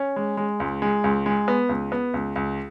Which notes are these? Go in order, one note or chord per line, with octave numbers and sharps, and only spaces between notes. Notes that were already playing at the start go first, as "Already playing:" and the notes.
Already playing: C#4
G#3
G#3
C#2
G#3
C#2
G#3
B3
C#2
B3
C#2
C#2